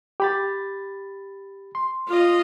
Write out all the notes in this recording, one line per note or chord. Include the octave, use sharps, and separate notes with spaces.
G4 B5 A6
C6
F4 D#5